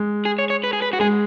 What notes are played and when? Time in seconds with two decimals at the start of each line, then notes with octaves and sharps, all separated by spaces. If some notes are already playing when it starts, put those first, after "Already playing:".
Already playing: G#3
0.25 G#4
0.39 C#5
0.50 C#5
0.64 B4
0.73 G#4
0.82 B4
0.93 F#4
1.00 G#3 G#4